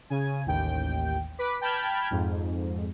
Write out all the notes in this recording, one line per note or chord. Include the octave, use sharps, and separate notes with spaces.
C#3 G#5
A1 D#2 G5
B4 D6 B6
G5 A5 B5 F6 G6 G#6
F2 G#2